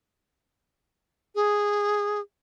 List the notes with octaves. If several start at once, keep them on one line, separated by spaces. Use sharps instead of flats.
G#4